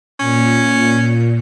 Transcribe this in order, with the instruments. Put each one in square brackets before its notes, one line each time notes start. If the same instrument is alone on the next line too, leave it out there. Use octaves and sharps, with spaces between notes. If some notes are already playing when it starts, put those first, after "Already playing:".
[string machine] A#2 [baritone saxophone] C#4